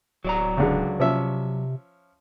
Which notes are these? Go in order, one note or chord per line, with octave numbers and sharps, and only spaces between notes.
D1 F#3 D5 A#5
C#2 D3 G#3
C3 F3 C#4 E5